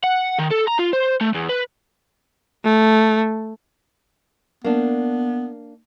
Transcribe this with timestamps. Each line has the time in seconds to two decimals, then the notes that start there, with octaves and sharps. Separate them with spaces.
0.03 F#5
0.38 D#3
0.51 A4
0.67 A#5
0.79 F4
0.93 C5
1.21 A3
1.34 E2
1.49 B4
2.65 A3
4.64 A#3 B3 D4